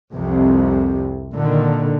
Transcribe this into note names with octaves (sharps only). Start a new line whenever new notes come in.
C2 F2 C3
A#2 D3 D#3